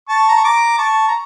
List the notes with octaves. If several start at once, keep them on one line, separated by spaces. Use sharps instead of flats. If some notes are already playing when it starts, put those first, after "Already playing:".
A5 C#6
A#5
C#6
A#5 D6
A5 C#6
A#5